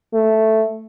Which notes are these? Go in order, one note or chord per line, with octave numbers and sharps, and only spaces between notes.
A3